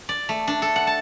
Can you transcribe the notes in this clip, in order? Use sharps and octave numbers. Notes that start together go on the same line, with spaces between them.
D5
A3
D4
A4
F#5
A5